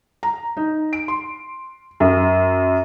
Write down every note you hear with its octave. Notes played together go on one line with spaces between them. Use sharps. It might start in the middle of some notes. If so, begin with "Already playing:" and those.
A#5
D#4
D7
C6
F#2